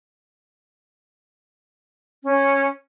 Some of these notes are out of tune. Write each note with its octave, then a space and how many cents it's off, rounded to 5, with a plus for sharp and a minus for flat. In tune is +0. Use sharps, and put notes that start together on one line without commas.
C#4 -10